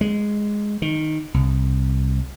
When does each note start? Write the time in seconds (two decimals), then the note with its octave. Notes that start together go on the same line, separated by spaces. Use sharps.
0.01 G#3
0.82 D#3
1.34 C2